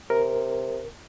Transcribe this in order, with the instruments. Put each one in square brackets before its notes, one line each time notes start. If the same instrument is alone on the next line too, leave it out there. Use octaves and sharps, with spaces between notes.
[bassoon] C3 [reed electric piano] A#4